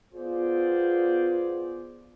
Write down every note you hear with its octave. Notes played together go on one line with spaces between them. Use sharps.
B3 F4 G#4 C5 D5